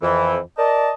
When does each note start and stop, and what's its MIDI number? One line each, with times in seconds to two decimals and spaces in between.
0.02 0.37 41
0.02 0.37 52
0.57 0.91 70
0.57 0.91 74
0.57 0.91 75
0.57 0.91 81